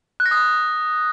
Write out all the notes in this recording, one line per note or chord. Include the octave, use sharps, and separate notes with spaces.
F#6
A#6
D#6